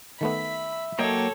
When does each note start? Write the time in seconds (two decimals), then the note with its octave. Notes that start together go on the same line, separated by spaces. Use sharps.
0.21 D#3 A3 B3 E5 B5
0.99 F#3 A#3 A4 C#5 D#5 G5 A#5